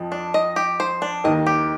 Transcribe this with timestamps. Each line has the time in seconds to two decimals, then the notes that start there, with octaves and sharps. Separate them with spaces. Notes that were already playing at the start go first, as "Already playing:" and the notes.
Already playing: F2 F3
0.12 D4
0.34 D#5
0.56 G4
0.80 C5
1.02 D4
1.24 D#2 D#3 D#5
1.47 G4